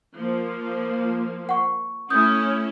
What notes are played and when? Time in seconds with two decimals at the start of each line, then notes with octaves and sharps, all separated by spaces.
0.14 F3 A#3
1.49 F#5 C#6
2.10 A3 C#4 E4 D#6 G6